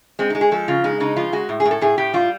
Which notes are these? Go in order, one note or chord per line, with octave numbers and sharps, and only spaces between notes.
G#3 C4
G#3 D#4
G#4
F3 A4
C#3 F4
G#3 D#4
C#3 D#4
F3 F4
G#3 F#4
A2
G#4
A2
A4
A2 G#4
A2 G4
G3 F4